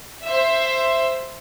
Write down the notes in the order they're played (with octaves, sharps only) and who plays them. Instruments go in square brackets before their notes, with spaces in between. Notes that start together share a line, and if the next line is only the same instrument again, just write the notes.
[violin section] C5 E5